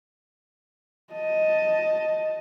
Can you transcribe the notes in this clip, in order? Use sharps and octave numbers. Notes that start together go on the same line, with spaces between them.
D#5 A5